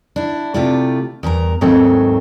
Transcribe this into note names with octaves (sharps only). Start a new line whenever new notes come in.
D4 E4
C3 A3 E4 F4 G4 D5
E2 G2 A#4 A#5
D#2 G#2 F#3 A3 C4 A4